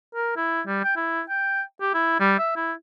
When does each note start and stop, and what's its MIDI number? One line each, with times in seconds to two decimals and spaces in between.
0.15 0.33 70
0.36 0.61 64
0.67 0.83 55
0.84 0.93 79
0.96 1.21 64
1.29 1.61 79
1.81 1.91 67
1.94 2.16 64
2.20 2.34 55
2.38 2.52 76
2.56 2.73 64